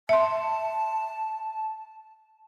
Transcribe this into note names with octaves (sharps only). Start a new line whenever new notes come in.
E5 A5 C6